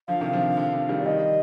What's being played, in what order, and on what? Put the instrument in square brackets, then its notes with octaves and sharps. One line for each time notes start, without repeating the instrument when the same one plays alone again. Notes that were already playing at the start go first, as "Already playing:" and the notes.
[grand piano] D3 F3 [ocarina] F5
[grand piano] C3 D#3
D3 F3
D3
D3
D#3 G3
[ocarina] D5
[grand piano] D#3 G3 [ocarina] D#5